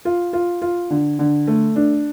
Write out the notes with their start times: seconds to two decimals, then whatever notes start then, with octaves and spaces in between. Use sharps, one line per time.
0.05 F4
0.33 F4
0.62 F4
0.90 D3
1.19 D3
1.47 A3
1.76 D4